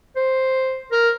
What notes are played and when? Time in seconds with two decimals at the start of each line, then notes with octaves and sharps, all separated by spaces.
0.16 C5
0.92 A#4